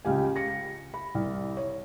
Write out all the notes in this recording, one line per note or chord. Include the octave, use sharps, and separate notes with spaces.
C#2 G4 G#5
A#6 C#7
B5
C2
C#5